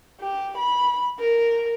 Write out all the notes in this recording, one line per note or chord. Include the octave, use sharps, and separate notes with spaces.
G4
B5
A#4